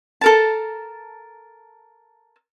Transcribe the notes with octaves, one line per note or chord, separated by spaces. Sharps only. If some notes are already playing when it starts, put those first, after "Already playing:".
A4 A#4 A5